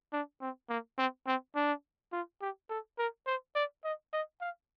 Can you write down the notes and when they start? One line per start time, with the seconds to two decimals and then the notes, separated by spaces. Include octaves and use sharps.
0.13 D4
0.41 C4
0.69 A#3
0.98 C4
1.27 C4
1.55 D4
2.13 F4
2.41 G4
2.70 A4
2.98 A#4
3.27 C5
3.55 D5
3.84 D#5
4.13 D#5
4.41 F5